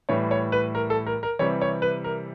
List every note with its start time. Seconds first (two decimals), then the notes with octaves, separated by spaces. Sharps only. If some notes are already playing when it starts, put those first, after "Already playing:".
0.09 A2 E3 G3 C#5
0.31 C#5
0.52 B4
0.75 A#4
0.90 A4
1.06 A#4
1.23 A#4
1.39 C3 E3 G3 C#5
1.61 C#5
1.82 B4
2.04 A#4